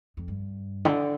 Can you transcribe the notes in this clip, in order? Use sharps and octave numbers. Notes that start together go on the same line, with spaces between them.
F2
G2
D3